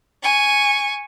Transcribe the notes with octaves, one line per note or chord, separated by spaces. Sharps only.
G#5 C#6